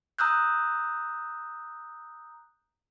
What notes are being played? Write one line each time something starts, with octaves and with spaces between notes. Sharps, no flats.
A#5 D#6 E6 F#6 G6